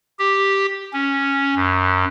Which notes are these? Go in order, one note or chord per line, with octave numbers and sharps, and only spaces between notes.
G4
C#4
F#2